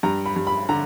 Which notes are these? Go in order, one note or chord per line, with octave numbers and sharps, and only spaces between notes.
G2 A#5
B5
G2
B5
D3 A#5